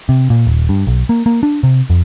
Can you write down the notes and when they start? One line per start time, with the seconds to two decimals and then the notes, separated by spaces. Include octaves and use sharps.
0.09 C3
0.30 A#2
0.47 D#1
0.69 G2
0.87 B1
1.09 A#3
1.26 A#3
1.43 D4
1.63 C3
1.90 F2